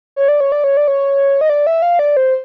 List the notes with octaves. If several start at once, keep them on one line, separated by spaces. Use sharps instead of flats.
C#5
D5
C#5
D5
C#5
D5
C#5
D#5
D5
E5
F5
D5
C5